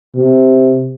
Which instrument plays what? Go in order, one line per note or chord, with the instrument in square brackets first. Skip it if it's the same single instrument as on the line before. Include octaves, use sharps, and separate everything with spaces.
[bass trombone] C3